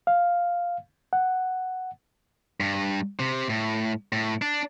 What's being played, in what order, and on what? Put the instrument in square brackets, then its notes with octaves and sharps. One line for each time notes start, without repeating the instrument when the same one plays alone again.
[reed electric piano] F5
F#5
[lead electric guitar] G2
C3
A2
A2
D4